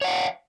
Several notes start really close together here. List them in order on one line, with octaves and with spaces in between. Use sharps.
C#5 F#5 F5